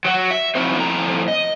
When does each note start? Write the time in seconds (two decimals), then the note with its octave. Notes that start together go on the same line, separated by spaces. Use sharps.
0.05 F#3 F#4
0.31 E5
0.55 F3 C4 D#4 E4 F#4 C5
0.77 F2 A2 A#5
1.28 D#5